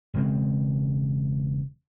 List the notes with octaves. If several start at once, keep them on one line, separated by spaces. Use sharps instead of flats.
E1 C#3 G#3 C4